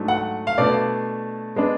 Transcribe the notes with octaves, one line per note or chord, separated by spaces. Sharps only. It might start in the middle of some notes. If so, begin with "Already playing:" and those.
Already playing: G#2 F#3 A3 D4
F#5
F5
B2 A3 D4 D5
G#3 B3 D4